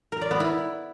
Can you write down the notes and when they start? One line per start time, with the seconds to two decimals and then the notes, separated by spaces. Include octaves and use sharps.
0.12 A#4
0.21 D5
0.31 B3
0.40 E4